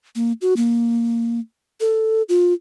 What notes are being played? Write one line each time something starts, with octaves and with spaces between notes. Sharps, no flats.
A#3
F#4
A#3
A4
F4